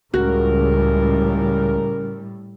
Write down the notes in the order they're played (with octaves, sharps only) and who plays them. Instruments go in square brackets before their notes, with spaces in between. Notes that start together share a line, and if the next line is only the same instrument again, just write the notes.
[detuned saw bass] C#2 [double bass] A2 G3 [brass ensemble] C#3 A#4 [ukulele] F#4